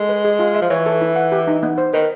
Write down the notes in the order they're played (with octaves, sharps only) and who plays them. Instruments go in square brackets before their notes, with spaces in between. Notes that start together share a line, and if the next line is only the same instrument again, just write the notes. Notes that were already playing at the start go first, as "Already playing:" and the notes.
Already playing: [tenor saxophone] G#3 [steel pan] A4
[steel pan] B4
G#4
F4
E5
[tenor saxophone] F3
[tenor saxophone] E3 [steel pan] C#5
[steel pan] A4
E4
F#5
G4
D#4
B3
C5
[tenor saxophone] D#3 [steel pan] B4